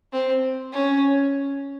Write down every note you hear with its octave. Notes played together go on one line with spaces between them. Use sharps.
C4
C#4